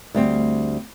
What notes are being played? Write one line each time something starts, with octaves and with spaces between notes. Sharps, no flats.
D2 G3 C4